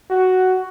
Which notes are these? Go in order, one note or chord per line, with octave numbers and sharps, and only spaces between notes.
F#4